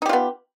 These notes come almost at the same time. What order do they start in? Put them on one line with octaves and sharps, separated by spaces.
D#4 G4 F4 B3